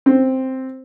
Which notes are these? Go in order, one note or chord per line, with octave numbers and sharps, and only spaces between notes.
C4